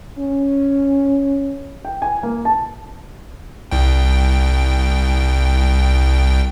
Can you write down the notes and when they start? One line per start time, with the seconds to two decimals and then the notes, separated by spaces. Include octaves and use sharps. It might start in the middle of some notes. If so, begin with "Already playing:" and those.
0.18 C#4
1.85 G5
2.02 G#5
2.23 A#3
2.45 A5
3.71 C2 G5